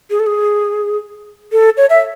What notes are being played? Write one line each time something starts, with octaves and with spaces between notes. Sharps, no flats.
G#4
A4
G#4
A4
C#5
E5